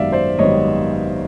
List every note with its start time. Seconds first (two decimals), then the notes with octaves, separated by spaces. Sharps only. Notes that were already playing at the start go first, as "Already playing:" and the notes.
Already playing: G#1 F#2 D#3 G3 B3 D5 E5 F5
0.12 C5 D5
0.39 G#1 F#2 D#3 G3 B3 C#5 D#5